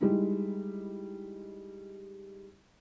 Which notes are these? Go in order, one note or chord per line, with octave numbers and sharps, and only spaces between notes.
G3 G#3 D#4 E4